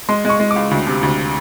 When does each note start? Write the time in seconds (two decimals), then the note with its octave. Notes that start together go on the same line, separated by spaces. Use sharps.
0.09 G#3 C6
0.25 G#3 C#6
0.40 G#3
0.51 D6
0.56 C#2
0.71 D2
0.87 C3
1.03 D2